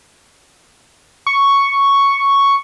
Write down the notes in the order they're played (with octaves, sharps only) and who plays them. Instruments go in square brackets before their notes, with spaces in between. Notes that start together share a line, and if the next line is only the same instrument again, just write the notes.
[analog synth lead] C#6